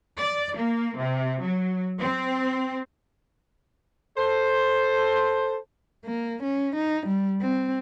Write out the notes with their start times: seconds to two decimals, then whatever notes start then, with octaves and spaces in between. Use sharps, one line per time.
0.17 D5
0.57 A#3
0.96 C3
1.41 F#3
2.00 C4
4.16 A4 C5
6.05 A#3
6.43 C#4
6.75 D#4
7.07 G3
7.41 C4